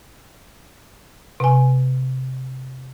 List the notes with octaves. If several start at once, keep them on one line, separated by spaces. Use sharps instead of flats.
C3 G#5